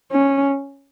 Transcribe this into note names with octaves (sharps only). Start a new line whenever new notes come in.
C#4